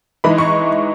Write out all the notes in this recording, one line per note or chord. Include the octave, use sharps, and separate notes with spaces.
E3 G#3 D#4 B5
C#6